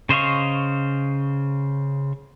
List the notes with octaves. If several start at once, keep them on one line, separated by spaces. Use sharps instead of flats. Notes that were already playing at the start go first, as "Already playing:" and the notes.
C#3 C5 D#5 F5 C#6